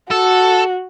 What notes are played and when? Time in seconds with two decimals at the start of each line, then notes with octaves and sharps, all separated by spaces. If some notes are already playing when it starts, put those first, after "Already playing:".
0.11 F#4 A4